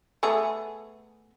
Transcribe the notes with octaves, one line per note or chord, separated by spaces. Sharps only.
A3 B3 G#4